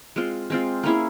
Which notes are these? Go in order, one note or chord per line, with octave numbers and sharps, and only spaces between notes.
G#3 C4 F4
G#3 C4 F4
A#3 C#4 E4 G#4